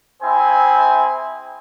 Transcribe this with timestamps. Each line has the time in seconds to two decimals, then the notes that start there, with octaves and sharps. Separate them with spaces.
0.22 C4 E4 G#4 C5 E5 G#5